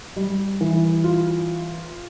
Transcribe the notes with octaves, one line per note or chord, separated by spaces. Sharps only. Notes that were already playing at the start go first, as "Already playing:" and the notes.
G3
E3
F4